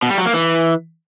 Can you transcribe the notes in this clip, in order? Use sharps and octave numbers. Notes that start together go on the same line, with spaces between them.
B2
G3
F#3
A#3
E3